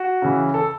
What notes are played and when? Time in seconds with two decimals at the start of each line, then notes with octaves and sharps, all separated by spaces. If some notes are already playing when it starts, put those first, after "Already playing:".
Already playing: F#4
0.22 C#3 E3
0.54 A4